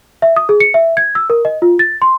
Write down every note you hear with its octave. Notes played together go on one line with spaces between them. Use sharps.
E5
D#6
G#4
C#7
E5
G#6
E6
A#4
D#5
F4
A6
C6